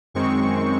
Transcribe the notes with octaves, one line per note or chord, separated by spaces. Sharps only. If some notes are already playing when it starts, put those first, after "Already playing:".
F#2 D#3 G#3 C4 C#6